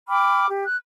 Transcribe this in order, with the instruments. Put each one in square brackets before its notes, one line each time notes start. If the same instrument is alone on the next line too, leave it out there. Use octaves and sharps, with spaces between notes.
[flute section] G5 B5 D6 F6
G4
F#6